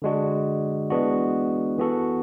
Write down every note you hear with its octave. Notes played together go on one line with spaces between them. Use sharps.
D3 G#3 D4 F#4
E3 G#3 B3 D4 F#4
E3 B3 F#4 A4